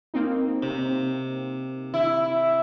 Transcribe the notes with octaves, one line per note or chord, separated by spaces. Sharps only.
A#3 C4 D#4
C3
E4